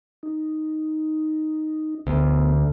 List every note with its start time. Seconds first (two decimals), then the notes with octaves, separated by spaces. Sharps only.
0.23 D#4
2.07 D2 B3